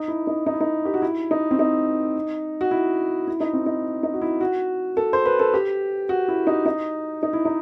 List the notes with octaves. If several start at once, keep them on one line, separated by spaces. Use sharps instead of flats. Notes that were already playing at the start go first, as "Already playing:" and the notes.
Already playing: D#4
E4
D#4
D#4
E4
D#4
G4
F#4
E4
D#4
C4
D#4
F#4
E4
E4
D#4
C4
D#4
D#4
F#4
E4
F#4
A4
C5
B4
A4
G4
F#4
E4
D#4
D#4
D#4
E4
D#4